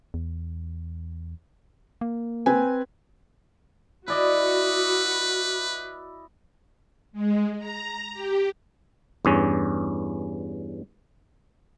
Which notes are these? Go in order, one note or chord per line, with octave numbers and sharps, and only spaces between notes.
E2
A#3
C4 B4 G#5
E4 F#4 B4 D5 D#5
G#3
A#5
G4
E2 G2 C#4